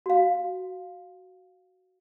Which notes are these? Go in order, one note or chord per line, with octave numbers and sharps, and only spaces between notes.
F#4 F5